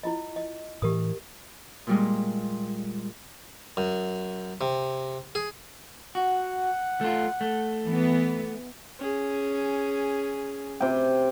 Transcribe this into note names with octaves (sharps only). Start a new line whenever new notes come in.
E4 F4 D#5
D#5
A2 E3 G4 A#4 D#6
A#2 G3 G#3
F#2
C3
G#4
F#4 F#5
A3 F4
A3
E3 B3
C#4 G#4
C3 G5